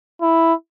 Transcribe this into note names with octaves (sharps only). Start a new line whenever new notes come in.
E4